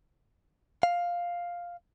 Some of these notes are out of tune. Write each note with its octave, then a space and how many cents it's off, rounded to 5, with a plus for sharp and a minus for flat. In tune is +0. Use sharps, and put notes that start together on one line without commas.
F5 +5